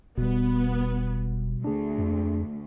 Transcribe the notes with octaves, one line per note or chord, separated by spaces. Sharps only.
E1 B2 G3 B3
D2 D4 G#4
F2